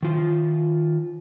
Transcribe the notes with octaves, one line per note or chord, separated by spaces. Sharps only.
D#3 F4